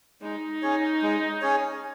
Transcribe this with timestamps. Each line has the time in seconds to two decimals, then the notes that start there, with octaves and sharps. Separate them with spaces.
0.22 G#3 D#4
0.62 C#4 G#4 C#5
1.02 G#3
1.41 C#4 G#4 C#5